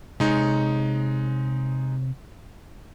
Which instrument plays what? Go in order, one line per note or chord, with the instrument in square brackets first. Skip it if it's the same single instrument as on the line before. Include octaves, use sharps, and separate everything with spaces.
[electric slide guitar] C3 C#5 [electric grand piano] G#3 D#4